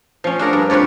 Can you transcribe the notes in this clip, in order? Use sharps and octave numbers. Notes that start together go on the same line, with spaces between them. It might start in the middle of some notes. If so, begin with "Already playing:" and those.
F3 C#4
D4 G#4 A#4 F#5
G2
F2 F3 B4 C#5 D5